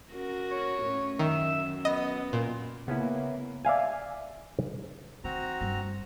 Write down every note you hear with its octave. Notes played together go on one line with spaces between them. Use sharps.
C#4 F#4 A#4
C#5
A2 A3 C#4
F#2 D#3 E5
B3 D#5
A#2
C#3 A#3 B3 C#4 E4
D5 E5 F5 G#5
D#3 C4 F#4 A#5
G2 G3